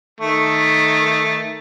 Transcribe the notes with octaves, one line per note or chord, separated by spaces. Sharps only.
D#3 A3